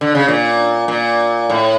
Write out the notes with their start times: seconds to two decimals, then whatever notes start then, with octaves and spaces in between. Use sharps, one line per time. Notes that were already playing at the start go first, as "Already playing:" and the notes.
0.01 D3
0.15 C#3
0.28 A#2
0.88 A#2
1.50 A2